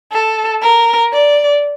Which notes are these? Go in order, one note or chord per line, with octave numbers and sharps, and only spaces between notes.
A4
A#4
D5